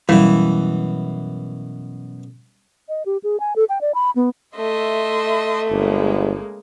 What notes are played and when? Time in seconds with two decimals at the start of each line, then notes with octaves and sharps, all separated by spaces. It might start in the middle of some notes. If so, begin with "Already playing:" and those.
0.09 F#2 B2 E3 G3
2.89 D#5
3.06 G4
3.23 G#4
3.40 G#5
3.56 A4
3.69 G5
3.81 D5
3.94 B5
4.16 B3
4.56 A3 D#5 E5 C6
5.70 G1 C#3 G#3 A#3